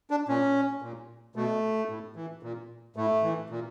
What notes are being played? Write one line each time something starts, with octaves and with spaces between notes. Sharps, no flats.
D4
A#2 C#4
A#2
B2 A3
A2
E3
A#2
A2 A3
E3
A#2